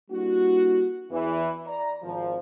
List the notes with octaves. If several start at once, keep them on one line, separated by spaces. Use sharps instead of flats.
G3 A#3 D4 E4 F#4
E2 E3
D5 A#5
G#1 F3